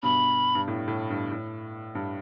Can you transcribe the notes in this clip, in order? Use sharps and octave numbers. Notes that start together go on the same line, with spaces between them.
G2 B2 B5
G2
A2
A2
G2
A2
G2